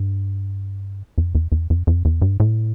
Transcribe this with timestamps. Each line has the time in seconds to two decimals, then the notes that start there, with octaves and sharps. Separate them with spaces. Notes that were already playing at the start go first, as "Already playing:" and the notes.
Already playing: G2
1.18 F2
1.35 E2
1.52 E2
1.70 F2
1.87 F2
2.05 E2
2.22 G2
2.40 A2